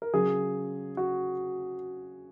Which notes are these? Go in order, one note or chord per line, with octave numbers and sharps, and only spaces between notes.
A#4
C#3 F#3 G#4
F#4